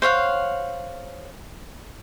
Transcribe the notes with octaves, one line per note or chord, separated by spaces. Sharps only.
C5 C#5 F5 F#5